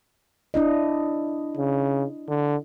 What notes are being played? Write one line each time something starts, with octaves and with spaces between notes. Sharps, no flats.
D4 E4 D#5
C#3
D3